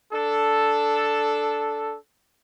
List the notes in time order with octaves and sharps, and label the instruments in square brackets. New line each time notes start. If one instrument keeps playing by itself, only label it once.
[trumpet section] D4 A4